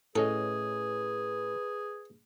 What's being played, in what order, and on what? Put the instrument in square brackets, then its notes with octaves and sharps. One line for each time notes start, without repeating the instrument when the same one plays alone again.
[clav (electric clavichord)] A2 C#4 D#5 [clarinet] G#4 [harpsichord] A4 [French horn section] B4